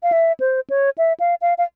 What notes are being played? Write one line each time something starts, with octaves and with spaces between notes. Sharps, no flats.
F5
E5
C5
C#5
E5
F5
F5
F5